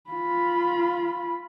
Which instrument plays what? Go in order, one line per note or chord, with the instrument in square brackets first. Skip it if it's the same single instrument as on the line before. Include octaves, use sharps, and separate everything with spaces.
[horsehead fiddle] F4 B5